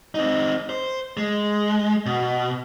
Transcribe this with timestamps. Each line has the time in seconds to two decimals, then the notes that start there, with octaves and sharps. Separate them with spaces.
0.15 C4 D#4
0.69 C5
1.17 G#3
2.06 B2